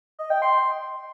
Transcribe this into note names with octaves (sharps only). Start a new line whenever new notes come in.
D#5
G5
C6